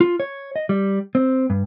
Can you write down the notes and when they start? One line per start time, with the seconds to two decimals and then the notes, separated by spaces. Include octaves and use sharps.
0.01 F4
0.20 C#5
0.56 D#5
0.69 G3
1.15 C4
1.50 G2